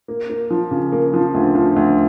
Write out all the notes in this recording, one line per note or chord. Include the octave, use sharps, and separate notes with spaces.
A#3
A#3
F3
C#3
A#3
F3
D2
F3
D2